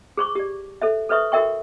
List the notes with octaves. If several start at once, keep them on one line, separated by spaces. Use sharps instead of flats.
G#4 C5 C#6 D6
G4 D5
A4 C5 E5
A4 B4 C5 E5 C#6 D#6
F#4 A4 A#4 E5 G5 C#6